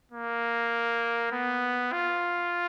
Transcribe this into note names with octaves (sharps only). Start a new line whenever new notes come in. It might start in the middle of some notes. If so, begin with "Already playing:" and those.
A#3
B3
F4